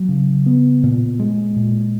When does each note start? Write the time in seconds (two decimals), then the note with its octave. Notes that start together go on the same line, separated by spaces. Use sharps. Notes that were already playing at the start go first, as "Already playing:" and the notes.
Already playing: F#3
0.09 C#3
0.46 B3
0.83 A#2
1.19 G#3
1.56 A#2